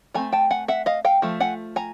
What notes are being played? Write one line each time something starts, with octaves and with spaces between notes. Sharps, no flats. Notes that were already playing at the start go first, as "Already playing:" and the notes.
F3 A3 C4 G#5 A#5
G5 A5
F#5 G#5
E5 F#5
D#5 F5
F5 G5
F3 A3
F#5 G#5
G#5 A#5